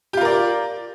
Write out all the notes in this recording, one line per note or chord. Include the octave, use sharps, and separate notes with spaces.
F4 G4 A#4 D5